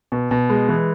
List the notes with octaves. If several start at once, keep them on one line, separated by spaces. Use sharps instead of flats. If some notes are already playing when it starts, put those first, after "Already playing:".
B2
B2
G#3
E3